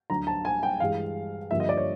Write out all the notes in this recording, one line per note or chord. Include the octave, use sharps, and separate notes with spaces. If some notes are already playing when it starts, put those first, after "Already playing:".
D2 D3 F#3 A#5
A5
G#5
G5
G2 E3 G#3 F5
G2 D3 F3 A#3 E5
D#5
D5
C#5